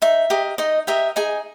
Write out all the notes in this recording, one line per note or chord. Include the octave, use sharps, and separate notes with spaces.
D#4 E5
G4 A#4 D#5
D#4 D#5
G4 A#4 D#5 E5
D#4 G#4 G#5